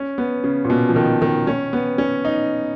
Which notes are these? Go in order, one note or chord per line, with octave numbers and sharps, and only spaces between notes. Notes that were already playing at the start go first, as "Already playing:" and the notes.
Already playing: C#4
B3
C#3
A#2
B2
F3
D#3
D#3
C#4
B3
C#4
D#4